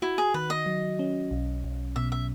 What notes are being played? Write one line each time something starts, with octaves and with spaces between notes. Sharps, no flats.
E4 F#4
G#4
D#3 B4
D#5
F#3
C#4
B1
B1
B2 E5
E5